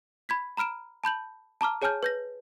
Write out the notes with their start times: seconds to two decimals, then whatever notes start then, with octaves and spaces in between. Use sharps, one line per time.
0.29 B5 G#6 B6
0.57 A#5 B5 F6 D7 E7
1.04 A5 B5 G6 F#7
1.61 A5 A#5 D6 F6
1.82 G#4 C#5 G#5 A5 F6 G6
2.03 B4 G6 A#6